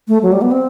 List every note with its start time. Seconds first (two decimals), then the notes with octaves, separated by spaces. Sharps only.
0.08 A3
0.23 F#3
0.32 G3
0.42 B3
0.52 C4